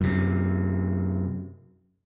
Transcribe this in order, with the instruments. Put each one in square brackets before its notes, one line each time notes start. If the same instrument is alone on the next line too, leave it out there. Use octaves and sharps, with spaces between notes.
[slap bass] F#2 C3